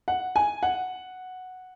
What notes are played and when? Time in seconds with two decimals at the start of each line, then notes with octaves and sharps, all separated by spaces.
0.08 F#5
0.36 G#5
0.63 F#5